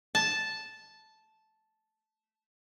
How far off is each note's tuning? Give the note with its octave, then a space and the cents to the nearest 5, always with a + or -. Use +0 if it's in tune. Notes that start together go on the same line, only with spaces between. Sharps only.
A5 -5